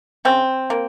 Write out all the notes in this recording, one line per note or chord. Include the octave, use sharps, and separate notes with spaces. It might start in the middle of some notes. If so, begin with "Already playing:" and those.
C#3 C4
A#3